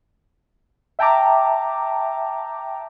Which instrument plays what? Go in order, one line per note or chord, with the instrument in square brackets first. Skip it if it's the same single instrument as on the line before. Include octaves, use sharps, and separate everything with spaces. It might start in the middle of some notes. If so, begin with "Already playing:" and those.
[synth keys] E5 G5 A5 A#5 D6